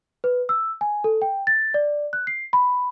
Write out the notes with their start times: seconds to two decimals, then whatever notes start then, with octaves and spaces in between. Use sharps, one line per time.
0.24 B4
0.49 E6
0.81 G#5
1.04 A4
1.22 G5
1.47 A6
1.74 D5
2.13 F#6
2.27 C7
2.53 B5